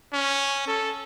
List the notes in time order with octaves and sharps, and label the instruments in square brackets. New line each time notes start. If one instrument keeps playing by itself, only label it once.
[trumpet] C#4
A4